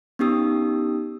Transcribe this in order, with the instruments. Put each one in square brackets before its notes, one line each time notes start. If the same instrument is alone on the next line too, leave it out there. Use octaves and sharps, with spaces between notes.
[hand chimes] B3 C#4 D#4 G4 D#6 E6